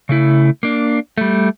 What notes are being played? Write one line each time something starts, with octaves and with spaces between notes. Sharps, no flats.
C#3 A3 E4
A#3 D4
G3 A3